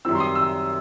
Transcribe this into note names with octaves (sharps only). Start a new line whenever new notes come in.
F#2 D#3 G3 C4 E6
C6
D#6
E6